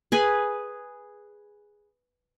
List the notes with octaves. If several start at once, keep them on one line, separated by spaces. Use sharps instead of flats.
G#4 B4 G#5